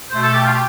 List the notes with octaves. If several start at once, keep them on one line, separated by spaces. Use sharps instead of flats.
B2 A3 C5
A4
G4
F4
G4